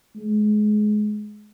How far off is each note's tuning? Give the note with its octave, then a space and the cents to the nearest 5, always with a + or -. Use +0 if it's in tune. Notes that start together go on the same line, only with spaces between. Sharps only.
G#3 +25